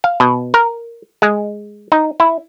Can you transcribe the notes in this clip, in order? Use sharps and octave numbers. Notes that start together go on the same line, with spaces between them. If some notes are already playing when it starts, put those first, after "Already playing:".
F5
B2
A#4
G#3
D#4
E4